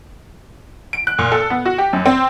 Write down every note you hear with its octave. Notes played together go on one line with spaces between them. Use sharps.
D7
F#6
A#2
A4
B3
F#4
G4
F#2
C4